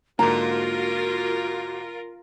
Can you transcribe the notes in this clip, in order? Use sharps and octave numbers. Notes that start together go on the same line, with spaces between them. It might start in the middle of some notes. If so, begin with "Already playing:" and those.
G#2 D3 A#3 F4 F#4 A#4 A#5